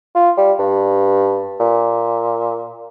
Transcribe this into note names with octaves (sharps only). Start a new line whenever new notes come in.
F4
G3
G2
A#2